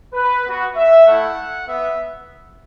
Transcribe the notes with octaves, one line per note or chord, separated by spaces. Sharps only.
B4
B3 F#4
E5
A3 E4 F#5
B3 E5